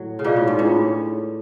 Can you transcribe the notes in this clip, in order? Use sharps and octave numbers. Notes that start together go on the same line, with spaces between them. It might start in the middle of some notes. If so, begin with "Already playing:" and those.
Already playing: A2 F#3
C#3
B2 F4 G#4 D5 F5
A2
G#2
A2 D4 F4 G#4 B4